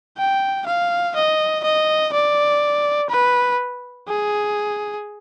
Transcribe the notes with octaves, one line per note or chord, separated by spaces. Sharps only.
G5
F5
D#5
D#5
D5
B4
G#4